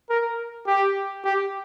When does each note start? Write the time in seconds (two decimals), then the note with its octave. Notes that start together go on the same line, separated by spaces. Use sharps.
0.10 A#4
0.67 G4
1.25 G4